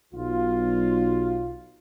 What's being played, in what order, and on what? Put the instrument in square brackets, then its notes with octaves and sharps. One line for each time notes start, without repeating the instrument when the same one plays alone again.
[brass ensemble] B1 F4